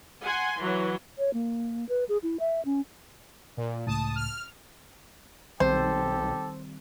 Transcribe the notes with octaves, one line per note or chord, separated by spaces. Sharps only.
F#5 G#5 C6
E3 F#3
C#5
A#3
B4
G#4
E4
E5
C#4
A#2
C#2 A2 A5 D#6
F6
B1 D#3 G3 C4 G4 A4 C5